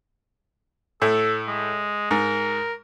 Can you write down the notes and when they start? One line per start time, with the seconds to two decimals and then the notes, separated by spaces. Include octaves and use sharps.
1.02 A2 A4
1.48 G#3
2.11 G#2 A#4